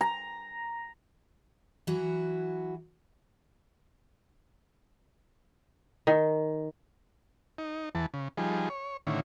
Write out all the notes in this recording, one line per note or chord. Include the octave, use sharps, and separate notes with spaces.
A#5
E3 F#3 E4 F#4
D#3
D#4
E2 E3 A5
C#3
F3 G3 D#4 G#4
C#5
A2 D3 D#3 C#4 E4